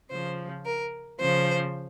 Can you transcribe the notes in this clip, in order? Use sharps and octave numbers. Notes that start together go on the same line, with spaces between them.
C#3 F3 C5
A#4
C#3 F3 C5